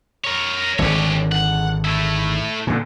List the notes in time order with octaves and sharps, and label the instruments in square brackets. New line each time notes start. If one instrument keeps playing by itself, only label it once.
[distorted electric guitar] A#4 C#5
[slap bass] G#1 D3 [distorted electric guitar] G4 C#5
[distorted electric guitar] F#5
A3 E4
[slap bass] A#2 D3